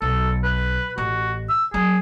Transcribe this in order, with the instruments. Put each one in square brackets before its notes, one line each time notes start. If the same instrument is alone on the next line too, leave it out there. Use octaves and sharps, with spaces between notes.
[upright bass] B1 [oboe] A4
[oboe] B4
[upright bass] A1 [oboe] F#4
[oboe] E6
[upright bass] F#3 C#4 [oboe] G#4